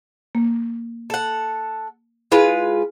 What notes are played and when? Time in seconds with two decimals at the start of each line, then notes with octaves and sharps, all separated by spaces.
0.35 A#3
1.10 A4 F#5
2.32 G#3 E4 F4 B4